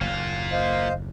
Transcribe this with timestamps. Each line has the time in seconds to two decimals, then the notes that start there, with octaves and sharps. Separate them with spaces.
0.01 F#1 D#2 A#3 F4
0.52 C5 D#5 F5